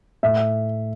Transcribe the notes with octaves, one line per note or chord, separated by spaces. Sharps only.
A2 E5